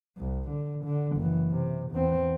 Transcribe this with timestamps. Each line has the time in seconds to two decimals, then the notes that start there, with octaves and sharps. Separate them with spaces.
0.18 C2
0.49 D3
0.84 D3
1.17 F#1 E3
1.51 C3
1.91 E2 C4